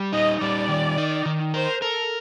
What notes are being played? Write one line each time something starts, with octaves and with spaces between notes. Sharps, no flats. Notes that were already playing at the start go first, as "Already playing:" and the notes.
Already playing: G3
D#4 D#5
G3 D5
D#3
D#4
D#3
A#4 C5
A4 A#4